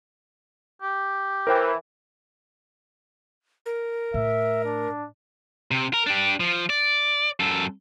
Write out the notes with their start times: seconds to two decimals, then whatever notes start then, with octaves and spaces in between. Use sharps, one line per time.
0.82 G4
1.47 E3 A#4 C5 G5
3.66 A#4
4.14 A2 E5
4.65 D4
5.71 C3
5.94 A#4
6.07 D4 G4
6.40 F3
6.70 D5
7.40 F#2 A4